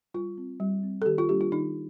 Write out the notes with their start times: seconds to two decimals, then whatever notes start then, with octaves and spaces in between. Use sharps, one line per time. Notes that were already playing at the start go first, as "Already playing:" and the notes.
0.14 G3 F4
0.38 C4
0.60 G3
0.83 C4
1.02 A4
1.06 D#3 G4
1.18 F4
1.29 G3 A#3 D4 G4
1.41 F4
1.52 D#3 D#4